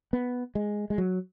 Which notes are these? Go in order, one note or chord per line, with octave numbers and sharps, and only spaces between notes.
B3
G#3
G#3
F#3